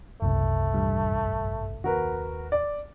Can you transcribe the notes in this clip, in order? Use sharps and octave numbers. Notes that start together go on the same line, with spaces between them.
F#1 C2 A3
A1 G2
D#2 F#4 A#4 B4
D5